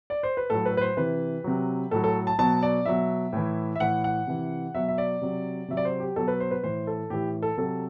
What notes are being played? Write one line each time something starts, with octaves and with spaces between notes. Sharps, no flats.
D5
C5
B4
A2 F#3 A4
B4
B4
C5
C3 E3 B4
C3 F#3
A2 F#3 A4
A4
A5
B2 F#3 A5
D5
B2 F#3 E5
A2 E3
E5
A2 E3 F#5
F#5
C3 E3
B2 F#3 E5
E5
D5
C3 F#3
C3 F#3 E5
D5
C5
G4
B2 F#3 A4
B4
C5
B4
A2 E3 C5
A4
A2 E3 G4
A4
C3 F#3 A4